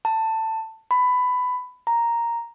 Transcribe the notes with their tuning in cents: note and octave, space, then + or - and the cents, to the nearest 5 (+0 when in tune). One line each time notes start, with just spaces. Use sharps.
A5 +15
B5 +15
A#5 +0